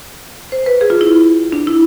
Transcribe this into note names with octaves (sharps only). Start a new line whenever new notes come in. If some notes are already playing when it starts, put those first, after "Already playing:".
C5
B4
G#4
F4
E4
D4
E4